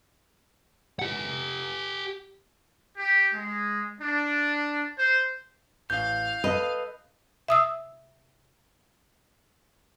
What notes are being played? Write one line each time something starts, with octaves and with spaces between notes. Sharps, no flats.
G4 F#5
G4
G#3
D4
C5
A1 F5 G6
A4 B4 D#5
E5 D#6 E6